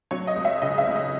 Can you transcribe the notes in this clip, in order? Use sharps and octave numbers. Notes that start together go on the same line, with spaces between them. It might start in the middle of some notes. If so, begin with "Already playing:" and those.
F#3 C#5
D#5
C#2
E5
C#3 D#5
E5
C#2
D#5